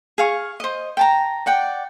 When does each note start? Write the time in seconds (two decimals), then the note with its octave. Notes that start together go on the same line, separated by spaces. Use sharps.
0.18 G#4 F5 C#6
0.60 C5 D#5
0.97 G5 A5 A#5
1.46 D5 F#5 G5